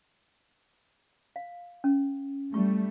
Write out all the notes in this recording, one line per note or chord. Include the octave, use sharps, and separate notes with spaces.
F5
C#4
G3 A3 C#6